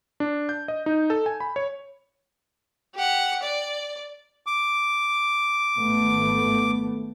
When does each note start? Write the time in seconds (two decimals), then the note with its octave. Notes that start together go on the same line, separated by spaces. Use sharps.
0.20 D4
0.49 G6
0.68 D#5
0.86 D#4
1.10 A4
1.26 G#5
1.40 B5
1.56 C#5
2.95 G4 F#5
3.43 D5
4.46 D6
5.76 G#1 A3 B3